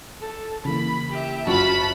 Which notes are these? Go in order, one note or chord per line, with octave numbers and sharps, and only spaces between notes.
A4
C#3 E3 A#3 B5
G4 E5
F#1 F#2 F4 F#4 A5 B5